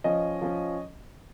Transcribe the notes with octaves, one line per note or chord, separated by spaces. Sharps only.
F3 C#4 D#5
F3 C#4